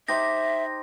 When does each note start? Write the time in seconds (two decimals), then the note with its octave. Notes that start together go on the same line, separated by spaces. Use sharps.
0.08 D#4 G4 C5 E5 A#6